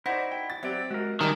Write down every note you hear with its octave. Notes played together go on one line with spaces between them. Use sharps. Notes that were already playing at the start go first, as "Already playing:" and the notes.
D#4 E4 F#4 C5 D5
G5
A6
F#3 C4 G4 D5 E5
G#3 F#4 A#4
D#3 G3 G#3 C#4 G4 A4 A5